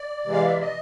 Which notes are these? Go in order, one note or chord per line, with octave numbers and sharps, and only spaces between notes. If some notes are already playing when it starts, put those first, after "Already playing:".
Already playing: D5
C3 E3 G#3
F5
E5
D#5